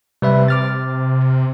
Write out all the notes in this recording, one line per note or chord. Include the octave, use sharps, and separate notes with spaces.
C3 G3 B4 E5
D6 F6 A6